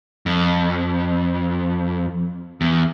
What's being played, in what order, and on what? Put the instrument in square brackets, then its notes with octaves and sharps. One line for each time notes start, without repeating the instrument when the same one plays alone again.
[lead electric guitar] F2
E2